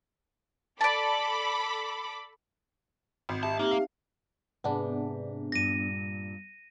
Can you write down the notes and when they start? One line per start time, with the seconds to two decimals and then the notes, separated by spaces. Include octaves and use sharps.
0.81 A4 D5 A5 B5 D6
3.29 G#1
3.43 G4 E5 A5
3.59 A#3 C4 D#4 G4
3.71 F5
4.64 G#2 C3 B3 D4
5.52 G2 A#2 A#6 D#7